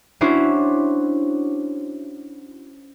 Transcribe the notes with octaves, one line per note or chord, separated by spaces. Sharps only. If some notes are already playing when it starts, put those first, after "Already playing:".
C#4 D4 E4 F#4 C5